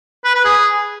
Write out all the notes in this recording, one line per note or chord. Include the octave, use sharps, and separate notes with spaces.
B4
B4
G#4